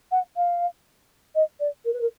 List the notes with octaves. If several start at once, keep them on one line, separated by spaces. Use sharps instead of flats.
F#5
F5
D#5
D5
A#4
B4
A#4